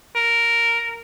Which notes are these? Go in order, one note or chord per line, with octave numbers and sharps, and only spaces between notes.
A#4